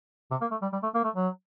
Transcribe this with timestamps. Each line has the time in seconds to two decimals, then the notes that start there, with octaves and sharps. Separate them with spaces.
0.31 C3
0.41 A#3
0.51 A3
0.62 G3
0.73 G3
0.83 A3
0.95 A#3
1.04 A3
1.15 F#3